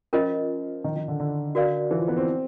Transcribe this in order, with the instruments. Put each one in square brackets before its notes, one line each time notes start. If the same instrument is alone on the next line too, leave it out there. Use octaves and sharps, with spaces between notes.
[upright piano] F3 [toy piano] C#4 F4 A#4 D#5
[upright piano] D#3
D#3
D3
D3
[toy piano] F#4 A#4 D5 F5
[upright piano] E3
F3
B3
C4